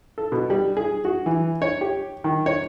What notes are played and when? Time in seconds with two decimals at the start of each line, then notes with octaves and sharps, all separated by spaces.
0.18 A4
0.32 B2
0.50 G3
0.77 G#4
1.05 F#4
1.26 E3
1.62 C#5
1.81 G4
2.24 D#3
2.46 C#5